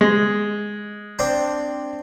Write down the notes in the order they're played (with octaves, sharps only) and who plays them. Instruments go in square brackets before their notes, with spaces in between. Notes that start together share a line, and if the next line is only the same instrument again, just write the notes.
[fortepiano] G#3
[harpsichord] C4 D4